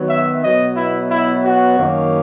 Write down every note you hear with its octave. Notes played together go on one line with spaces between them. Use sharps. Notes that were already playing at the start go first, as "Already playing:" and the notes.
Already playing: D#3 F#3 B3
E5
B2 F#3 B3 D#5
E4
E4
F#4
F#2 D#3 A#3 C#4